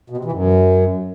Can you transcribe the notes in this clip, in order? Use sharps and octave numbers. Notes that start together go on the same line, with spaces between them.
B2
C3
E3
F#2